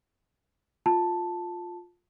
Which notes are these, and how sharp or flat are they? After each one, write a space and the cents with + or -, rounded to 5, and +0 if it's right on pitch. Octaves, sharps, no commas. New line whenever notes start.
F4 +15 A5 +0